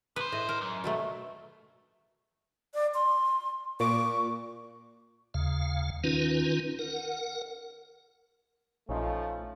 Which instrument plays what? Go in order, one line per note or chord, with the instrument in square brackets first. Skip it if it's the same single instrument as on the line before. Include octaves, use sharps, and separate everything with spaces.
[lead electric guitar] B1 C5 [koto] B4
[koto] A2 D#5
A#4
[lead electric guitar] F#2
[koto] B2 F#3 A3
[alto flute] D5
C6
[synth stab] A#2 D6 [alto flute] C#6
[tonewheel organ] D#2 C#3 F5
D#3 C#4 D#4 F4 B4
A#4 F#5
[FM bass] A#1 [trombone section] F3 A3 [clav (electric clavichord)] C#4 D#4 F4